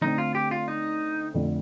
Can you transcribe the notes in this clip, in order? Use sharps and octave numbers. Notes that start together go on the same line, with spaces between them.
D3 A3 C4 D#4
F4
G4
F4
D#4
F2 D3 A3